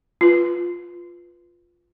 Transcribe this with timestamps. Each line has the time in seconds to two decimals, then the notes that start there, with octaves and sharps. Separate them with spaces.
0.21 F4 B4